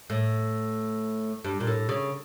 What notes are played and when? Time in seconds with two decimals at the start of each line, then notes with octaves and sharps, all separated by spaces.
0.10 A2
1.44 G2
1.60 A#2
1.67 A2
1.89 C#3